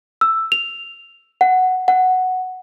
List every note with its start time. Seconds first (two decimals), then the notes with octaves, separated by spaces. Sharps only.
0.21 E6
0.52 F7
1.41 F#5
1.88 F#5